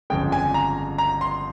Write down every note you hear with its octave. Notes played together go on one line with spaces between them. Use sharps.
G1 F2 C#3 G#3 G5
G#5
A#5
A#5
C6